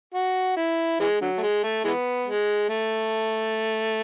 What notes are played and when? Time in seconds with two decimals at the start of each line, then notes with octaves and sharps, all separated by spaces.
0.14 F#4
0.57 E4
1.00 E3 G#3
1.21 D3 F#3
1.38 A3
1.42 G#3
1.64 A3
1.84 E3 G#3 B3
2.27 G#3
2.70 A3